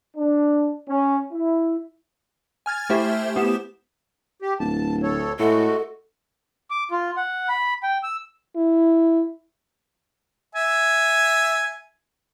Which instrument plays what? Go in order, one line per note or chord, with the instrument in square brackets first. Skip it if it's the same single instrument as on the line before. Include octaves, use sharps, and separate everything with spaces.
[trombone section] D4
C#4
E4
[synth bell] G#5 F6 G#6 A6
A3 E4 G4 C5 E5 G5
B3 G4 E7
[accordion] G4
[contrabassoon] D1 [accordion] A5
[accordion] D2 A4 C#5
[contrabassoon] A2 [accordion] G#3 A3 F#4 [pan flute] A4
[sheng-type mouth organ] D6
F4
F#5
B5
G5
E6
[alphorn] E4
[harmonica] E5 G#5